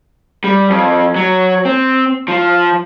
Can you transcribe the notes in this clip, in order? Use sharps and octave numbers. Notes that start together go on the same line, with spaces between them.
G3
F2
F#3
C4
F3